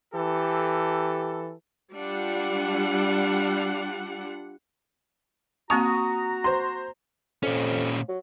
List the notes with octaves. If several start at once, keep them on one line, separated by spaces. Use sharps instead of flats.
E3 G4 A4
G3 D4 F4 F#5
A#3 C4 F#4 A5 A#5 C#6 D#6
C5 C6
F2 A#2 C#4
F#3